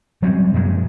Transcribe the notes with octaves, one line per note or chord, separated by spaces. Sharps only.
F#3 G3 C4 C#4
F#2 A#2 F3 G#3